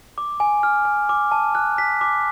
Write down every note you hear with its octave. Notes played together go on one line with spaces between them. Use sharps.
D6
G#5
F6
G#5
D6
A5
F#6
B6
D6